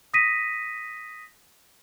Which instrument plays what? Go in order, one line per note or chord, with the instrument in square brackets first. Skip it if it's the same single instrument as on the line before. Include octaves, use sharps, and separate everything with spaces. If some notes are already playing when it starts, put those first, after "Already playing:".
[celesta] D#6 A#6 B6 D#7